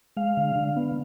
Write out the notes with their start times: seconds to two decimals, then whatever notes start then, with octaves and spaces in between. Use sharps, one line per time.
0.17 G#3 F5
0.37 D3
0.56 D3
0.76 B3